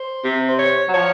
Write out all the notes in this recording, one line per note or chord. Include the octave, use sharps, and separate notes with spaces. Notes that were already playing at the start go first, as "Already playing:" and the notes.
Already playing: C5
C3
C5
C#5
F#3
F3 C#5